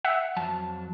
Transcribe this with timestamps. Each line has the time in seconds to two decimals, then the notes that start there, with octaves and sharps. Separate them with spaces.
0.05 E5 F#5
0.37 F2 F#3 A5